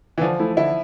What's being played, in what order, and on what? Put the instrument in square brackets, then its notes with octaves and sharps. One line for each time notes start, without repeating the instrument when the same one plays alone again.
[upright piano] E3
[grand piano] D3 [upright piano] F3
[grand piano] A3 E4
[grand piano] D3 [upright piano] E4